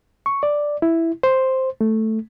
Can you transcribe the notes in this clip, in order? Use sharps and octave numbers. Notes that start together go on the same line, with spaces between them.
C#6
D5
E4
C5
A3